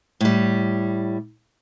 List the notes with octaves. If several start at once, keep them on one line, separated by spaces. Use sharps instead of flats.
A2 G3